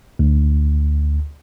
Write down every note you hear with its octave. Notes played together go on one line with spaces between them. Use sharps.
D2